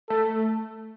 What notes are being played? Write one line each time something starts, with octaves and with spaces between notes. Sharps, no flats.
A3 A4